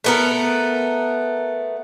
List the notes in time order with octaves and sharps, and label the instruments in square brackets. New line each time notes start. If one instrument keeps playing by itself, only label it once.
[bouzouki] A3 B3 A#4